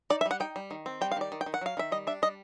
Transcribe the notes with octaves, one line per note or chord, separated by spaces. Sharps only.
D#4 D5
E5
G3
F#5
D#4 G5
G3
D#3
C4
G3 G5
F5
D#3 D5
D#3
G5
D#3
F#5
F#3 F5
D#3 E5
G3 D#5
D4 E5
G3 D#5